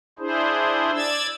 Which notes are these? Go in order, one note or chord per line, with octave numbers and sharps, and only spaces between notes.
D4 E4 G#4 C5
D5 E6 G#6 A6